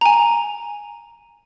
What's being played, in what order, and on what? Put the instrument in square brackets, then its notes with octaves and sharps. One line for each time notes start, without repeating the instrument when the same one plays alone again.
[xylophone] G#5 A#5